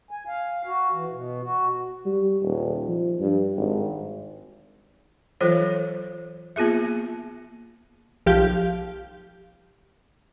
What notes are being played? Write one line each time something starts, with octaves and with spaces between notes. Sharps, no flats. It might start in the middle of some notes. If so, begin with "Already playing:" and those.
G#5
F5
F#4
E3
B2
F#4
G3
D#1
F3
G2
G#1
E3 F#3 F4 A4 C5 C#5
A#3 B3 F4 G#4 E5
B1 F3 G4 F5 G6